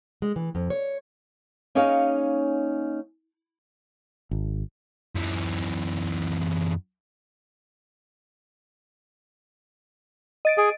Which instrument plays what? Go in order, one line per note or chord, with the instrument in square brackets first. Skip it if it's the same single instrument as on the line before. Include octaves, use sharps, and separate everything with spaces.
[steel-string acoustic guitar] G#3
E3
F2
C#5
[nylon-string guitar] A#3 C#4 D#4 G#4 C#5 F5
[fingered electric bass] G#1
[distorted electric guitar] F#2 E3
[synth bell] D#5 A6 D7
[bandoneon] G#4